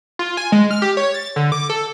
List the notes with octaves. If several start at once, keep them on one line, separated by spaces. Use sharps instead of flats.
F4
G#5
G#3
F6
G4
C#5
A6
D3
D6
A4